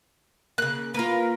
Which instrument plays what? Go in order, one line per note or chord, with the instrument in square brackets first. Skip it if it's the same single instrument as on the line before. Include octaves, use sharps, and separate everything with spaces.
[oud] C#3 A#3 [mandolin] F#6
[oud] A#3 F4 [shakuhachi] A#4 [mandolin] B4